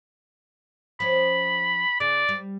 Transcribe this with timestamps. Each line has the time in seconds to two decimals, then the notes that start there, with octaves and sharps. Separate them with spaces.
1.00 F3 C#4 B5
2.00 C#3 D5
2.29 G3